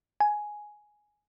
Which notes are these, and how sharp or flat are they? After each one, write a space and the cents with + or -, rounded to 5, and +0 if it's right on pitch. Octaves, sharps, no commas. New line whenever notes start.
G#5 +5